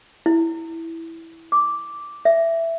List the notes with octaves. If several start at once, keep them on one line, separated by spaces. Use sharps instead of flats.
E4
D6
E5